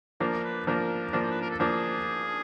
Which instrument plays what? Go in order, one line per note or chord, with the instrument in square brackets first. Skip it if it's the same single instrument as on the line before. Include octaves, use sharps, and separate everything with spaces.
[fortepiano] F3 A#3 D4 [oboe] A#4
[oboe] B4
[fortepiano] F3 A#3 D4 [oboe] A#4
[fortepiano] F3 A#3 D4
[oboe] C5
B4
A#4
A4
[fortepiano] F3 A#3 D4 [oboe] G#4